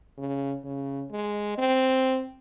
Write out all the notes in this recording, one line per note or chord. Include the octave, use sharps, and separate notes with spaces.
C#3
C#3
G#3
C4